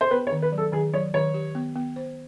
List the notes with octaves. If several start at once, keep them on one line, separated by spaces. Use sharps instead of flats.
C5
B3 B4
C#5
D#3
B4
F#3
A4
D#3 G#4
F#3 C#5
D#3 C#5
G4
B3
B3
C5